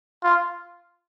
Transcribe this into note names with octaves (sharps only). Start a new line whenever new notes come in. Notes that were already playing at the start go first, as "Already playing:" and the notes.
F4